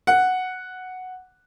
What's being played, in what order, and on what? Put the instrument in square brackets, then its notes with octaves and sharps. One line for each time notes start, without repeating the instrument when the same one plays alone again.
[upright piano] F#5